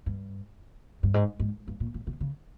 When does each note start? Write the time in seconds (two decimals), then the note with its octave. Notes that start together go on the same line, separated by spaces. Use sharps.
0.06 G2
1.03 G2
1.14 G#2
1.40 G#2
1.68 G2
1.80 A#2
1.94 A#2
2.07 C3
2.20 C#3